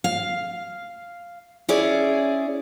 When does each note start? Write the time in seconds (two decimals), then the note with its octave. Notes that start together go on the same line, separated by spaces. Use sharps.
0.04 F5
1.69 C#4 E4 G#4 D5